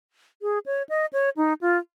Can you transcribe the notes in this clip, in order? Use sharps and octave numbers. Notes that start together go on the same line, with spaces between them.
G#4
C#5
D#5
C#5
D#4
F4